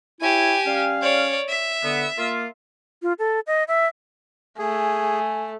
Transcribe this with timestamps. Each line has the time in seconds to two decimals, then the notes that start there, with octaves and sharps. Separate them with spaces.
0.21 E4 G4 C#5 G#5
0.67 G3 C#4 F5
1.02 C#5 D5
1.49 E5
1.83 D3 B3
2.18 A#3 F4
3.03 F4
3.19 A4
3.47 D#5
3.68 E5
4.59 A3 G#4 G#5